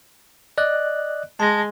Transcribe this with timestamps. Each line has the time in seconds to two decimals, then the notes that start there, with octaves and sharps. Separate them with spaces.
0.58 D5 D#5 F#6
1.40 G#3 A5 A#6